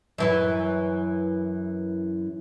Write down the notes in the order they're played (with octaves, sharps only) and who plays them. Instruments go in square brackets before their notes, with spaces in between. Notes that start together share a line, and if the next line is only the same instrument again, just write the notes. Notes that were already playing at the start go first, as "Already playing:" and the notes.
[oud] F#2 E3 E4